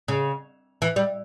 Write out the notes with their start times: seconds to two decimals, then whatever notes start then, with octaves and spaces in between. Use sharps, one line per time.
0.08 C#3
0.82 E3
0.96 G3